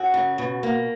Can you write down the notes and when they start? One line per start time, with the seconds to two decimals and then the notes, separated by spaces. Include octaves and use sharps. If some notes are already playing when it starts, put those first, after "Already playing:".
Already playing: F#2 F#4
0.14 C#3
0.38 B2
0.63 A#3